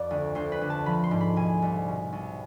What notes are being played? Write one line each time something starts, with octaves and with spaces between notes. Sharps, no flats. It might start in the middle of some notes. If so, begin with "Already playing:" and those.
Already playing: F2 C5 D5
D2
D2 C5
B4
D2
A5
F3 B5
C6
G#2
B5
B2 G#5
C2
B2
C2